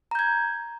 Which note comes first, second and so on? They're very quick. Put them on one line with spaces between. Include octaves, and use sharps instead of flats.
A#5 G6 G#6